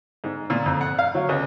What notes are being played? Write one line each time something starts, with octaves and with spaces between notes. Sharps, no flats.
G#2
A#2
F2
F#5
F5
F#3
C#2